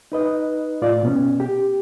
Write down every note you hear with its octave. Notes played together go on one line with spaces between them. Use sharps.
D#4 B4 D#5
A2 F4 D5
B2 B3 C#4
G4